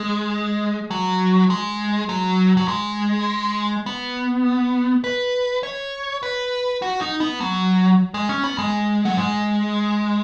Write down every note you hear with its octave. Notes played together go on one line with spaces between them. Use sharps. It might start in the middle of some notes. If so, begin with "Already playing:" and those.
Already playing: G#3
F#3
G#3
F#3
F#3
G#3
B3
B4
C#5
B4
F#4
D#4
B3
F#3
G#3
C#4
B3
G#3
F#3
G#3